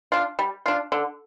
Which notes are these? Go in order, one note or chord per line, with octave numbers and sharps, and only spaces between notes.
D4 F4
G3
D4 F4
D3